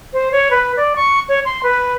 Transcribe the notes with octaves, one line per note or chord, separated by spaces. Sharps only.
C5
C#5
B4
D5
C#6
C#5
C6
B4